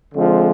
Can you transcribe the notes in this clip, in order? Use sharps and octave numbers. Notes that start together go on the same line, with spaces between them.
D3 F3 G#3 C4